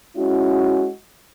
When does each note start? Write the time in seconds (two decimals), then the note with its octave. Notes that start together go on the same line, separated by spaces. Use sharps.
0.16 G#3 C#4 E4 F#4